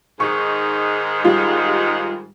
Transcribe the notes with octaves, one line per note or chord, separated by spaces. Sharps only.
G#2 D#3 G#3 C#6
G3 F4